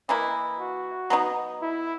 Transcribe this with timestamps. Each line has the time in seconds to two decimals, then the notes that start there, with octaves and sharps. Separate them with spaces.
0.09 E3 A#3 E4 D#5
0.60 F#4
1.10 F#3 B3 D#4
1.62 E4